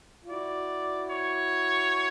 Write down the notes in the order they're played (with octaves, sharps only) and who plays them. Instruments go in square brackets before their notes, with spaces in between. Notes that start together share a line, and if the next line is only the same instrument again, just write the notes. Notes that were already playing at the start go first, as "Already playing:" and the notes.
[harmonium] F4
[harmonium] E4 F#4 [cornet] D5
[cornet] C#5